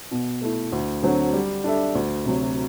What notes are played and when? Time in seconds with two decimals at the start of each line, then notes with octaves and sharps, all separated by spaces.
0.11 B2
0.42 A3 E4
0.72 D2
1.03 D3 F#3 C4
1.33 G3
1.64 D4 A4 E5
1.95 D2
2.25 C3 F#3